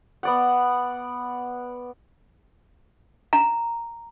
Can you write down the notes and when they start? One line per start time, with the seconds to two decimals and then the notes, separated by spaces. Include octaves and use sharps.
0.23 B3 D5 F#5
3.33 A#5